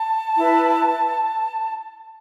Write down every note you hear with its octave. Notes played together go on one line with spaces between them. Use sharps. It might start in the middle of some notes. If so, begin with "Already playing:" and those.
Already playing: A5
E4 B4